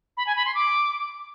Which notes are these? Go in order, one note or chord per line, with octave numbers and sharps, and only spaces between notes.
B5
G#5
B5
C6
D6